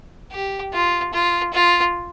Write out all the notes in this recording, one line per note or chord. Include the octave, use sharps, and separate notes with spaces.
G4
F4
F4
F4